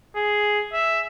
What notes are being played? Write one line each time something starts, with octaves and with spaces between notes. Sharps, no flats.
G#4
E5